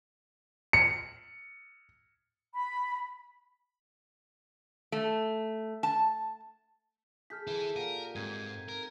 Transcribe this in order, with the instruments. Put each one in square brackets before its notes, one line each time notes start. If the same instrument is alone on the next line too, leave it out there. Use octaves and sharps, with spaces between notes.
[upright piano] C#7
[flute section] B5
[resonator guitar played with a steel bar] A3
A5
[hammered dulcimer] G#4 A4 [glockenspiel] F6 G6 B6
[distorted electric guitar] E4 B4
[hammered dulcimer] A#2 G4 F#5 [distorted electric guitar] A#4 [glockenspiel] D#7
[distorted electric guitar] G#2 [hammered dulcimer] C4 A#4 D#5 [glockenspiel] G6 G#6 D#7
[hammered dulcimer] D#4 [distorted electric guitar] A#4